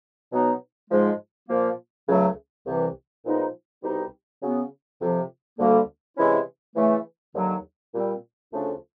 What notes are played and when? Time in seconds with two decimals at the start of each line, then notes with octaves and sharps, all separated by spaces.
0.32 B2 F#3 B3 D#4
0.90 G#2 F3 G#3
1.49 A#2 F3 A#3
2.07 C#2 C#3 F#3 A3
2.66 C2 C3 E3
3.24 A#2 F3 G#3 B3 D#4
3.83 C2 B2 G3 C4 D#4
4.42 C#3 F#3 B3
5.01 F2 C3 F3
5.59 D2 D3 G3 A#3
6.18 C3 E3 G#3 C#4 E4
6.76 C#3 E3 A3
7.35 D#2 D3 F#3
7.93 A#2 G3 C4
8.52 D2 C#3 F3 A3 D4